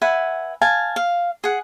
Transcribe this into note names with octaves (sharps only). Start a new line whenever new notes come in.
B4 E5 F#5 G#5
F5 G#5 A5
F5
G#4 F#5